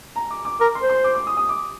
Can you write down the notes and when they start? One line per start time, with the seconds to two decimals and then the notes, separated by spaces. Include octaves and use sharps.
0.16 A#5
0.31 D6
0.45 D6
0.60 A#4 D6
0.75 C6
0.82 C5
0.89 C6
1.04 D6
1.15 D6
1.27 D#6
1.37 D#6
1.49 D6